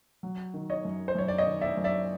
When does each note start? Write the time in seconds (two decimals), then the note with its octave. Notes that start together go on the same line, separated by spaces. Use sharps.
0.23 F#3
0.54 D#3
0.70 C#5 D#5
0.85 F#2
1.08 C5
1.15 F#2 C#5
1.28 D5
1.38 C#5 D#5
1.46 D#3
1.61 D5 E5
1.77 F#2
1.84 D5 E5